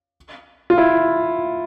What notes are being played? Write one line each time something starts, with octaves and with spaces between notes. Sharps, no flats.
F4
E4